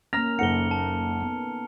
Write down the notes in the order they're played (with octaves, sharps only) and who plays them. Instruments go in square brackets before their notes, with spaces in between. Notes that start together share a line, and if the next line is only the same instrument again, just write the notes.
[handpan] A#3 C#4 [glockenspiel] A#5 F6 F7 [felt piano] A#6
[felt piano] F#1 F#5 [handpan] D#4 A4 [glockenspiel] C#7 G7
[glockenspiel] A5
[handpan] B3